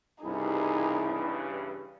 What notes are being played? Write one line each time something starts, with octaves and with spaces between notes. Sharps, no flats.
C2 G2 C#3 E3 D#4 E4 G#4